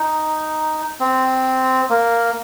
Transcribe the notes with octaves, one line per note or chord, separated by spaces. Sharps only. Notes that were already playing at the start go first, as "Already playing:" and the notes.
Already playing: D#4
C4
A#3